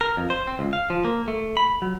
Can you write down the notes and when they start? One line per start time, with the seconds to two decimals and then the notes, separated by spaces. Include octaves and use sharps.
0.01 A#4
0.17 F2
0.30 C5
0.47 C4
0.59 C#2
0.73 F5
0.90 F3
1.05 A#3
1.28 A3
1.57 B5
1.82 F#3